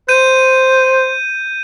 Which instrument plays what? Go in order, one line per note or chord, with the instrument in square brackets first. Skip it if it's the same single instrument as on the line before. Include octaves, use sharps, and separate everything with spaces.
[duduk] C5 [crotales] G6 D#7